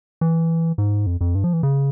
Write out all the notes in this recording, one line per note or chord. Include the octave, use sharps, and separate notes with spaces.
E3
G#2
F2
F2
G2
F3
E3
C#3